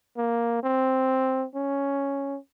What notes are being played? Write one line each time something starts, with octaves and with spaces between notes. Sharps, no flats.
A#3
C4
C#4